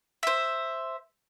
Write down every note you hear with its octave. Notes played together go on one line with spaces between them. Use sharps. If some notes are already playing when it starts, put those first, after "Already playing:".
C5 E5